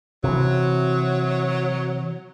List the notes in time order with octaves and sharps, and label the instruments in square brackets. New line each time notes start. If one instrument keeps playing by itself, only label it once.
[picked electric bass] C3 E3 [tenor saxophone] F#3